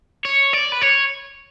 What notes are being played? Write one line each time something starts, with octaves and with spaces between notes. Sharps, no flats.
C#5
D5
B4
C#5